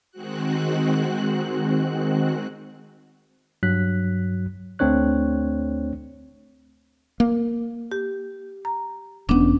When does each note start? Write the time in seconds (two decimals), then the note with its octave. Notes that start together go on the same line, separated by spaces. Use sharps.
0.11 D#3 G#3 C4 F#4 F#6
3.63 G2 F#3 F#6 B6
4.79 D2 A3 C4 D4 C#5 F#6
7.20 A#3
7.92 G4
8.65 A#5
9.29 E1 B3 C#4 D4